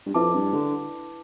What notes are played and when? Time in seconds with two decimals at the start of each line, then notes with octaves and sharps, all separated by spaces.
0.06 G2
0.14 F2 E4 B4 E5 A5 D6
0.34 G2
0.53 D3